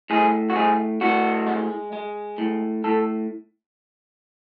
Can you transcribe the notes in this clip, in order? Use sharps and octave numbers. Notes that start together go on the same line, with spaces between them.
A2 G#4
F#4
A2 G#4
A2 F#4
G#3
G#3
A2
A2 A4